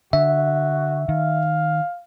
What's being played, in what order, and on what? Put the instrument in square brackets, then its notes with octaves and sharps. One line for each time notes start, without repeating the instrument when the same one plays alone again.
[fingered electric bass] D3 [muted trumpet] F#4 [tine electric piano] E5
[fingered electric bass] D#3 [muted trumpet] F5